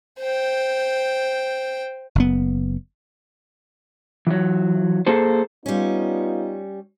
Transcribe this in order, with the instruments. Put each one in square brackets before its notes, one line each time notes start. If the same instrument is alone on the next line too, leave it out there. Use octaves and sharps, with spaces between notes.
[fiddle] C5 G5
[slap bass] F#1 B3
[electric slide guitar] E3 F#3
A#3 G#4 A4 C5
[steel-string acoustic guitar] G3 C#4 [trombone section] B3 D#4 F4